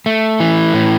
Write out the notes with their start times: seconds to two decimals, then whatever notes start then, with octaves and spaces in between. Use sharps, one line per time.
0.06 A3
0.40 E3
0.74 A2